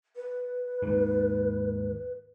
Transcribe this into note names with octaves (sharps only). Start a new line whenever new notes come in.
B4
D#2 G#2